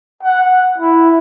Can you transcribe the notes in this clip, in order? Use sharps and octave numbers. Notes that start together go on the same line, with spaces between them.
F#5
E4